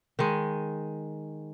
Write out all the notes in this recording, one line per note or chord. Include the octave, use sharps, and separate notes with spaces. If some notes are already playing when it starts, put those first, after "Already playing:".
D#3 G#3